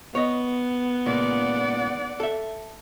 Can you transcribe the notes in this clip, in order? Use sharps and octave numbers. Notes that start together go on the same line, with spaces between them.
B3 C#5 D#5
C#2 A#2 D5 F#5
A4 E5